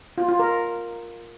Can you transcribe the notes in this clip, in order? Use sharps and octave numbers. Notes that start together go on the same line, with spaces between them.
F4
F4
A#4